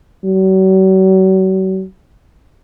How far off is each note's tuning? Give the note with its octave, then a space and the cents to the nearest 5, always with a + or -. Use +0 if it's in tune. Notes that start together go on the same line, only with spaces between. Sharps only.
F#3 +40